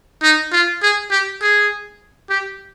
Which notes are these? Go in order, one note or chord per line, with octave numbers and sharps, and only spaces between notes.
D#4
F4
G#4
G4
G#4
G4